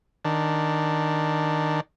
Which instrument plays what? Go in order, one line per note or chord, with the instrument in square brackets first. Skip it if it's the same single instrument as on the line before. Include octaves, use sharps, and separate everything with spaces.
[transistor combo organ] D#3 D4